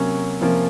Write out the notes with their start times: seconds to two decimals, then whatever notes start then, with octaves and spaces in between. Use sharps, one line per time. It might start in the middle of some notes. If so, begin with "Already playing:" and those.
Already playing: C3 F#3 A#3 C#4
0.41 C3 F3 A#3 C#4 F4